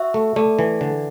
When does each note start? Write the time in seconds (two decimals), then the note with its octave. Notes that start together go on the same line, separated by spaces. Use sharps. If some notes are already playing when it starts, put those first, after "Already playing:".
Already playing: F#4 E5
0.14 A3
0.36 A3 D5
0.59 E3
0.81 D3